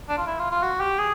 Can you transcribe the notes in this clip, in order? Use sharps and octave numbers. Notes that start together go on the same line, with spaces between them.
D4
F4
E4
F4
F4
F#4
G4
G#4